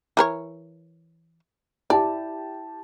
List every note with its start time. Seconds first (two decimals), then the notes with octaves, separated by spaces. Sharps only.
0.17 E3 A#4 C#5
1.90 E4 G4 D5 A5